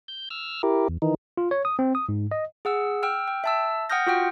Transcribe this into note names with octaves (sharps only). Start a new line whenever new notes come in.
G6
E6 F6
E4 G4 A#4
E2
D#3 E3 D#4
F4
C#5
D#6
C4
D#6
G#2
D#5
G#4 F#5 E6
G5 E6 F6
G5
E5 A5 E6
F#5 G5 D#6 F6 G6 A#6
F4 F#4 F#5 G5